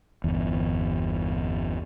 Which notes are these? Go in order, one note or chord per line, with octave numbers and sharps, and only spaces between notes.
G1 E2